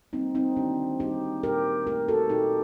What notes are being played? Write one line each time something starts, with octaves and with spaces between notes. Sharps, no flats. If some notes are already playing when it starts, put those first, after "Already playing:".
G3 A#3 C4 D#4
C4 D#4
D#3 D4 F#4
G3 A#3 D#4 G4
A#2 G4 A#4
A3 G4 A#4
F#4 A4
A#2 D#4 G4